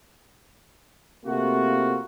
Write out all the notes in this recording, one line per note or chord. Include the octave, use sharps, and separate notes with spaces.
C3 A3 A#3 C4 F4 F#4